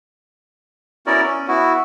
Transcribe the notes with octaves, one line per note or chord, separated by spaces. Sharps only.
B3 C#4 E4 F#4 A#4 D5
C#4
B3 E4 F#4